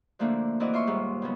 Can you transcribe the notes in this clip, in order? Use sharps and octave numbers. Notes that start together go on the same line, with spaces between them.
D3 F3 A3 A#3 D4 E4
E3 C4 E4 F#4 D5 D#5
F4 E5 C6 C#6
D#2 G#2 G3
C#3 F#3 B3